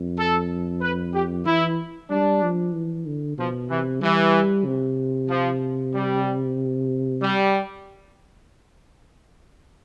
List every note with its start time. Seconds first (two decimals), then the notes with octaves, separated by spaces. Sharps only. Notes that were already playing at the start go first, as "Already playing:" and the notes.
Already playing: F2
0.18 A4
0.82 B4
1.14 G4
1.46 E3 E4
2.10 G3 D4
2.42 F3
2.74 E3
3.06 D3
3.38 B2 F3
3.70 C3 E3
4.01 E3 G3
4.66 C3
5.29 F3
5.94 G3
7.22 G3